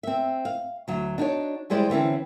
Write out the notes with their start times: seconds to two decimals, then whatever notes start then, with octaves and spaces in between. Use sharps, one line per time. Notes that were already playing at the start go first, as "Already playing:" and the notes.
0.03 C4 E5
0.45 F5
0.88 D2 F#3
1.18 D4 D#4 F#4 C#5
1.70 E3 G3 G#3 C5 D5
1.90 D3 E3 C4 C#4